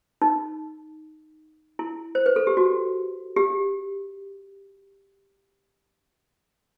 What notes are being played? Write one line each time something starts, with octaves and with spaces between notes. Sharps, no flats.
D#4
E4
C5
B4
A4
G4
F#4
G4